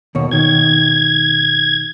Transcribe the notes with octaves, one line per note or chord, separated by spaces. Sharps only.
D#2 B2 C#5
B2 D#3 G#6